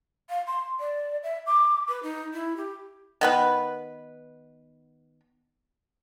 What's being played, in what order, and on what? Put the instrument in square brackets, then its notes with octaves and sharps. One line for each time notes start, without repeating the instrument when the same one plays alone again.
[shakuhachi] F5
C6
D5
E5
D6
B4
D#4
E4
G4
[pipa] D#3 B3 B4